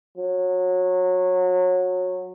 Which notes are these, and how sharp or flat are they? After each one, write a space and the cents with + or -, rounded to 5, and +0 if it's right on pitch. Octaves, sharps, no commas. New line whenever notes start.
F#3 -20